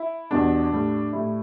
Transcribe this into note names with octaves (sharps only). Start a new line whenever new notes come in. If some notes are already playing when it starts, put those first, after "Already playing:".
Already playing: E4
E2 B2 G3 D4
A2 G3
A2 G3 E4